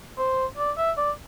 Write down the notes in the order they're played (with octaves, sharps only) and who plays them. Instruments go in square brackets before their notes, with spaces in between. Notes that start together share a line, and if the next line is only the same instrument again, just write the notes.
[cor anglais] C5
D5
E5
D5